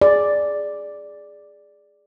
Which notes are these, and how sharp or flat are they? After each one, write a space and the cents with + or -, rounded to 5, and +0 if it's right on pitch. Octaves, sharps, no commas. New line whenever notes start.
G#4 +0 D5 +0